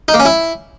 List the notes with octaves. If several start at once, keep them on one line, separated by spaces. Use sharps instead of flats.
D#4
A#3
C#4
E4